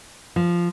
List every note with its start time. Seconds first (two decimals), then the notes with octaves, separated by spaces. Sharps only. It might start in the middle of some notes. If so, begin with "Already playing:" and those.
0.36 F3